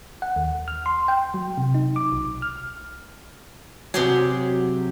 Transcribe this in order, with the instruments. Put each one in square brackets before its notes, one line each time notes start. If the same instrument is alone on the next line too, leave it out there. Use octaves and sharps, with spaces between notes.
[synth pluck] F#5
D#2
F6
C6
G5
F#3
C3
D#4
D6
B1
F6
[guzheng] C3 G4 G#4 [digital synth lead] F#3